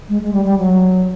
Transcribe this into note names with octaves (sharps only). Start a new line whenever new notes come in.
G#3
G#3
G3
G3
F#3